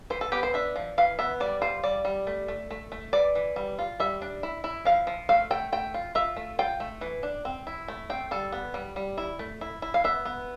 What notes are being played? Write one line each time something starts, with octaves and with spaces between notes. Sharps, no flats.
E3 C5
A4
B3 G4
C5
D4 E5
F3
E3 F5
B3 E5
G3 D5
F4 C5
G3 D5
G3
A3
A3
A3
A3
E3 D5
E3
G3
F4
G3 E5
D4
E4
E4
F3 F5
F3
A3 F5
A3 G5
A3 G5
F4
F4 E5
A3
F4 G5
A3
E3
D4
C4
E4
A3
C4 G5
G3 A4
B3
G3
G3
E4
A3
E4
E4
F5
B3 E5
B3